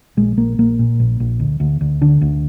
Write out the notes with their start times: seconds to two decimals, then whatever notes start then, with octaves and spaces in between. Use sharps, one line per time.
0.17 A#1 G#3
0.37 A#1 A#3
0.59 A#1 A#3
0.79 A#2
1.00 A#1
1.20 A#1
1.40 D2
1.60 D2
1.81 D2
2.02 D3 D4
2.22 D2